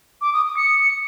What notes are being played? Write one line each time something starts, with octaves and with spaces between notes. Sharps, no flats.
D6
D#6
D#6
C#7